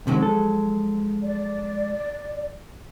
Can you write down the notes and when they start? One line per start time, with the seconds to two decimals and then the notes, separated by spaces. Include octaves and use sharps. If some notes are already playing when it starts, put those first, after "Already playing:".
0.07 C3 D#3 F3 F#3 G#3
0.22 A4
1.22 D5